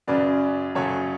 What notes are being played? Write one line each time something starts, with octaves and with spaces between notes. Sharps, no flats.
F#2 C#3 F#3 B4 D5
F#2 C#3 F#3 A4 C#5